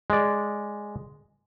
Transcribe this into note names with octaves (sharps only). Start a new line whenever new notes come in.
G#3 D5